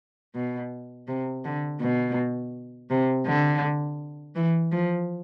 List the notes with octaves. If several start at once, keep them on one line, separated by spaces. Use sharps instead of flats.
B2
C3
D3
B2
C3
D3
E3
F3